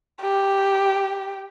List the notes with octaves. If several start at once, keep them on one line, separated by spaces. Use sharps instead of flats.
G4